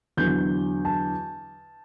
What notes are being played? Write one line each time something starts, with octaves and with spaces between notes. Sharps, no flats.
E2 D3 F#3 G6
A5